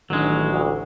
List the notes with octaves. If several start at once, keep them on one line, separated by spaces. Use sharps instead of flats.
A1 D#3 F#3 G#3 D4
D2